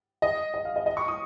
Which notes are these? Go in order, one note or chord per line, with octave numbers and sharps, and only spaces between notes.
D#5
D#5
F5
D#5
D#5
C#6
D#6